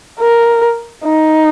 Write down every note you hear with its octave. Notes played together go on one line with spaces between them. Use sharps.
A#4
D#4